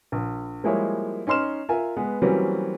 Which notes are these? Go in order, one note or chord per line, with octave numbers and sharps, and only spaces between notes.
A#1
F3 G3 G#3 A#3 E4 C#5
C#4 D#4 C6 F6 E7
F4 A#4 E5 G#5
G#3 B3 B4
E3 F#3 G3 A#3 C4 C#4